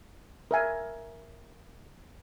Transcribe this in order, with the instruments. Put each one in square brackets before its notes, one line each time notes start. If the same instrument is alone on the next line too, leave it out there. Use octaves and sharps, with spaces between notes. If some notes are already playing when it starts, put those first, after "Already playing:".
[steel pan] A#4 E5 G#5